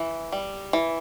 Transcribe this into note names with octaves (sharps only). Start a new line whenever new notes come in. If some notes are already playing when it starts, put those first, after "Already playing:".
Already playing: E3
G3
E3